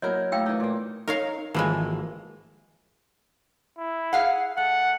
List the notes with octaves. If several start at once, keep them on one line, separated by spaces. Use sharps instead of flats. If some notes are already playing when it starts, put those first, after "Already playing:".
F#3 A#3 E4 A#4 D#5 G6
A3 E4 F5 G5 E6
E3 D#4
A#2 A#3
D#4 A#4 C#5 F5
G#1 E3 F3 G#3 A#3 A5
E4
G#4 F5 F#5
A3 F#5